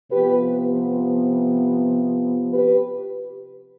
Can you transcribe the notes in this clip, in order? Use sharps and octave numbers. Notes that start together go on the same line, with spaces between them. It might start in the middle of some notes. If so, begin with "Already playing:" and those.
C3 F3 B3 G4 B4
G4 B4